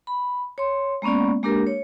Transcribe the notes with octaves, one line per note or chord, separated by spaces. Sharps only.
B5
C#5 C6
G#3 A#3 B3 C#4 D5
G#3 A#3 D4 G4 A#4
C#5